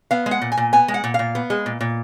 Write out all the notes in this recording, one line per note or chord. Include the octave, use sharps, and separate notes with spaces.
B3 F5
G#3
F#5
A#2
G#5
A#2
B3 G#5
G#3
F#5
A#2
A#2 F5
B3
G#3
A#2
A#2